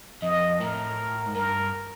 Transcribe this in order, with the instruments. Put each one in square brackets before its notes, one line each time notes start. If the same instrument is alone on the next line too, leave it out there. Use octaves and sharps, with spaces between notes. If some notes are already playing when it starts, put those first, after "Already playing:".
[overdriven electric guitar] F2 [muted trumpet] D#5
[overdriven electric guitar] A2 [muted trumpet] A#4
[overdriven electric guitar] G#2
[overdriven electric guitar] G2 [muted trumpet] A#4